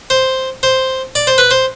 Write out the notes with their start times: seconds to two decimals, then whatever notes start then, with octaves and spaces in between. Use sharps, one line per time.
0.10 C5
0.63 C5
1.15 D5
1.27 C5
1.38 B4
1.51 C5